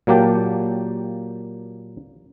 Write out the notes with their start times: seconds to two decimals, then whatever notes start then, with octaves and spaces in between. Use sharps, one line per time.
0.07 A#2 F#3 A#3 G4 G5 A5